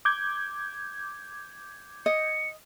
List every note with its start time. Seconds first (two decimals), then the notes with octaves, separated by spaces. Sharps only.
0.05 D6 G6 G#6
2.06 D#5 C#7